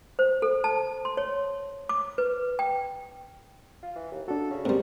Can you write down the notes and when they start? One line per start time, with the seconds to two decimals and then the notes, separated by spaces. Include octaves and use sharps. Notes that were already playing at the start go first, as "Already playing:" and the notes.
0.19 C5
0.42 A4
0.64 A5
1.05 C6
1.17 C#5
1.89 D6
2.18 B4
2.59 G5
3.83 F4
3.96 E3
4.11 D#2
4.28 D4 F#4 A4
4.50 C#3
4.65 G#2 G3 C4 A#4 C5